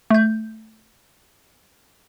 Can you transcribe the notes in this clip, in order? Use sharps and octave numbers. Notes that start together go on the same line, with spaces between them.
A3 G6